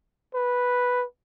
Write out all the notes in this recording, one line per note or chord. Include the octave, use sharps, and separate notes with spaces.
B4